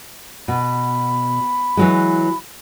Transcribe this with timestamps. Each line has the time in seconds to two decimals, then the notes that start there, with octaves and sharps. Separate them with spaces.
0.48 B2 B5
1.77 E3 F#3 G#3